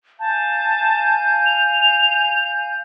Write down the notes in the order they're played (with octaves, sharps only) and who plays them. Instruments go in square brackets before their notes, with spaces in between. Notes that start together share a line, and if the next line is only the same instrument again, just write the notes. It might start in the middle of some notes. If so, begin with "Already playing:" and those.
[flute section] F5 G#5 G6 [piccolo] A5
[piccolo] F7